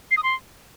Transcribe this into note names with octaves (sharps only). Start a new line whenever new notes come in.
C7
D#6
C6